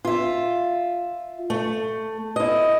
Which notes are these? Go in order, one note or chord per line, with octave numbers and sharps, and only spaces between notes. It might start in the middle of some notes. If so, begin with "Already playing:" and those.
F4 E5
A3
E4 D#5